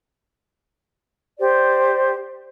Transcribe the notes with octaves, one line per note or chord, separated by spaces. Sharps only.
G4 C5 D5